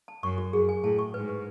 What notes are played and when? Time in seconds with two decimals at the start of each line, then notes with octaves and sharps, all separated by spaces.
0.08 A5
0.23 F#2 C#6
0.38 F#4
0.53 F#2 G#4
0.69 G#5
0.83 A2 A5
0.99 C#6
1.14 G#2 B4
1.29 B4